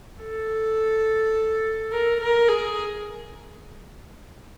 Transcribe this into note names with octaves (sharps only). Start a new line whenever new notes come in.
A4
A#4
A#4
G#4